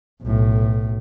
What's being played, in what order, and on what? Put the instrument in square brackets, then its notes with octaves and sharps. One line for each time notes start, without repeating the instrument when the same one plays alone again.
[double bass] B1 A2